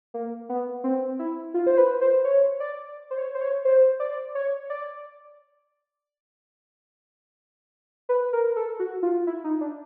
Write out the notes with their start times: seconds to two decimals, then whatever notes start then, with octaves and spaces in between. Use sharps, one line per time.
0.14 A#3
0.49 B3
0.84 C4
1.19 E4
1.54 F4
1.67 C5
1.78 B4
2.01 C5
2.24 C#5
2.60 D5
3.11 C5
3.18 C#5
3.35 C5
3.41 C#5
3.65 C5
4.00 D5
4.35 C#5
4.70 D5
8.09 B4
8.33 A#4
8.56 A4
8.80 F#4
9.03 F4
9.27 E4
9.44 D#4
9.61 D4